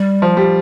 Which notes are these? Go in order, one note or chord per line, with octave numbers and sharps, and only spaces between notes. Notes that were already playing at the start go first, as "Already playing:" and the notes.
Already playing: G3
F3
G3